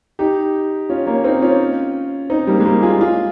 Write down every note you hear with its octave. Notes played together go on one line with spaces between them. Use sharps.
D#4 G4
C#4 F4
A#3 C#4
C4 D#4
C#4 F4
C4 D#4
G3 A#3
G#3
G3 A#3
F4 G#4
F4 G#4